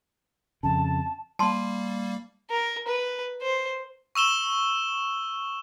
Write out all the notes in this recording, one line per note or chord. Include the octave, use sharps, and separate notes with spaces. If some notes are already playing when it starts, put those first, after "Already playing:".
F2 C#3 A5
G3 A#3 A5 C6
A#4
B4
C5
C#6 E6 E7 G7